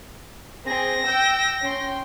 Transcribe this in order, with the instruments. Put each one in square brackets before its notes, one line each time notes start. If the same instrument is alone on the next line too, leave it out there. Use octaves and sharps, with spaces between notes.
[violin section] C4 G#4 [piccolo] A#6
[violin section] G5 E6 G6
C#4 G5 C6